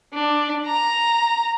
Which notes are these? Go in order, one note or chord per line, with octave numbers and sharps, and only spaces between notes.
D4
A#5